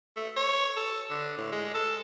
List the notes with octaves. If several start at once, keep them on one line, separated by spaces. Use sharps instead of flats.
A3
C#5
A4
D3
A2
G#3
A4